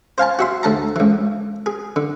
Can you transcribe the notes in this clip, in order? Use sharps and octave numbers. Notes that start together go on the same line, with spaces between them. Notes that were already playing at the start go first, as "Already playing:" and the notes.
C5 F5 G#5 A5
F#4 E5 C6
D2 A4 A5 A#5
C#2 E3
G#4
D3